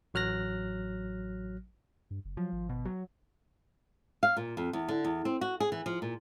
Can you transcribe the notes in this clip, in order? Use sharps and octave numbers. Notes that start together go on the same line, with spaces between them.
A1 F#3 F6 F#6 A#6
G2
F#1
F3 F#3
G#1
B2
F#3
F5
A#2
F2
E2
D3
E2
C4
F#4
G#4
E3
F3
A#2